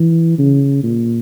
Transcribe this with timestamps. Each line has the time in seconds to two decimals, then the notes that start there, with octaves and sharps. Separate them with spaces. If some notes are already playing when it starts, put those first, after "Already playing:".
Already playing: E3
0.39 C#3
0.83 A#2